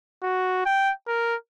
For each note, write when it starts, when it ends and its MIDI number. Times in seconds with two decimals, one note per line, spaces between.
0.22 0.62 66
0.65 0.91 79
1.07 1.35 70